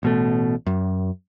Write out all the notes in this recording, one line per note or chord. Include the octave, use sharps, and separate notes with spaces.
A1 B2 A3
F#2